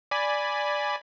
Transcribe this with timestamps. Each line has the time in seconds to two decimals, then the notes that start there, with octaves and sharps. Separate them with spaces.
0.11 D5 G#5 B5